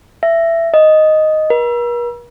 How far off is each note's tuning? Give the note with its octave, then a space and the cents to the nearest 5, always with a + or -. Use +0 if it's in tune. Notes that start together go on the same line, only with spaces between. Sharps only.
E5 +15
D#5 +0
A#4 +45